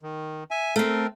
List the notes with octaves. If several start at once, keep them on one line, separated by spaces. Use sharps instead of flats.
D#3
E5 G#5
A3 C4 A#4